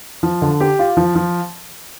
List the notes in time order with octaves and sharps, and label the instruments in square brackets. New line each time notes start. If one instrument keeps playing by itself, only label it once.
[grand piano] F3
D3
G4
F4
F3
F3